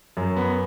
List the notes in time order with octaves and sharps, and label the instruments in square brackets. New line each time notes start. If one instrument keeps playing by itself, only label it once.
[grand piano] F#2
B3